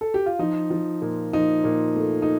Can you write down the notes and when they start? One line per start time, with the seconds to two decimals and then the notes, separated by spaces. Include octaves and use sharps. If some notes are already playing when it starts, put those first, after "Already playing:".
0.01 A4
0.14 G4
0.26 F4
0.39 F3 D#4
0.70 F3
1.02 A#2
1.33 F3 D#4
1.64 A#2
1.96 A3
2.22 D#4